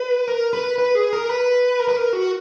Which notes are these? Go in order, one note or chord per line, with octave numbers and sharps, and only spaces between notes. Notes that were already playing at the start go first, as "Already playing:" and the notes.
Already playing: B4
A#4
B4
B4
G#4
A#4
B4
A#4
B4
A#4
F#4